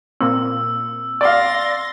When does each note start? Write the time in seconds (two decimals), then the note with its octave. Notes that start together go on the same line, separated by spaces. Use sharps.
0.21 A#2 A#3 C4 E6
1.21 D5 F5 C6 A6 A#6